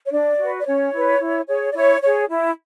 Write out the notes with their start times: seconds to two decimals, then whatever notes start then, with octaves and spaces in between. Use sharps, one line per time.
0.06 C#5
0.12 D4 D5
0.38 F#4
0.43 B4
0.60 D5
0.66 C#4 C#5
0.93 E4 B4
1.20 E4
1.48 G#4 C#5
1.70 D5
1.75 E4 C#5
2.02 G#4 C#5
2.29 E4